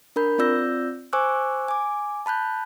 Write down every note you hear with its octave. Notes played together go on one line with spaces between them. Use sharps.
D4 A#4 B5 G6
C4 F4 D5 E6 G6 A#6
C5 G#5 C#6 D6 E6 F#6
G#5 D6
A5 B5 F#6 G6